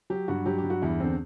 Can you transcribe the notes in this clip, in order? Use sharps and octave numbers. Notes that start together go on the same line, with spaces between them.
F#3 G4
G2 F#4
F#3 G4
G4
G2
F#4
E2 E4
D3 C4